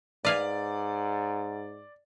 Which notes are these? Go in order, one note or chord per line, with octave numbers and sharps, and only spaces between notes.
G#2 B4 D5 F5 G#5